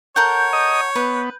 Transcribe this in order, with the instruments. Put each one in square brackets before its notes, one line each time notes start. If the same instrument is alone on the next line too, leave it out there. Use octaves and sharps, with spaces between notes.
[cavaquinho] A4 A#4 F#5 [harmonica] C#5 [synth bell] G6
[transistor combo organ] D#5 D#6
[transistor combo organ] B3 [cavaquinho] B4